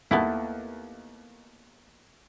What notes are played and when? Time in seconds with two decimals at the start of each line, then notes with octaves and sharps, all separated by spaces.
0.11 D#2 A3 B3 E4